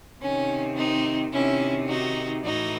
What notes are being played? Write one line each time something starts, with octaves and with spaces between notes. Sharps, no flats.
C3 D#3 C#4
C4 D#4
C3 D#3 C#4 E4
D#4 F#4
A2 E3 D#4 F#4